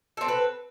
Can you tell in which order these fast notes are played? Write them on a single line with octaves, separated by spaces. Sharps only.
A4 C4 D4 B4